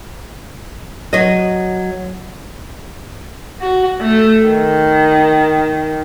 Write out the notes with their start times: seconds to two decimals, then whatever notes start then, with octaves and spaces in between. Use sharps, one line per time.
1.13 F#3 D#5
3.61 F#4
4.01 A3
4.47 D#3